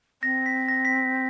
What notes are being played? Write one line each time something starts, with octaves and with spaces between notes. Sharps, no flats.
C4 A#6
B6
A#6
B6